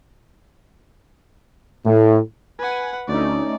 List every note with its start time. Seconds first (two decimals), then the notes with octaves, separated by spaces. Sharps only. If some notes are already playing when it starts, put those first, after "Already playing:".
1.85 A2
2.58 B4 F#5 G#5
3.08 D2 A3 C#4 D#4 D5